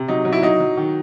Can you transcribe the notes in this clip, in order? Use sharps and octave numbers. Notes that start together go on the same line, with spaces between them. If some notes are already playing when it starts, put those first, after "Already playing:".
Already playing: C3
F#3 D#4
F#3
E4
F#3 D#4
F#3
D#3